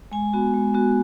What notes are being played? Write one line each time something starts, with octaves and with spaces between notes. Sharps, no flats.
G#3 G#5
B3 F#4
G#3
B3 F#4